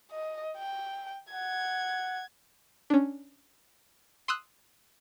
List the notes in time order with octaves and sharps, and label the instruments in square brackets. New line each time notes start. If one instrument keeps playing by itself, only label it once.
[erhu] D#5
G5
[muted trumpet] F#5 [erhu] G#6
[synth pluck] C#4 D4
C6 D#6 E6 F#6